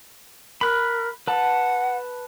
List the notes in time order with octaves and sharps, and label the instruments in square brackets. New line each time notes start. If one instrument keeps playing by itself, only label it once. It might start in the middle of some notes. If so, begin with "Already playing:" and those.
[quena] A#4 [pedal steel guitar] B5 F#6
[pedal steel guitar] B4 A5 [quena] F#5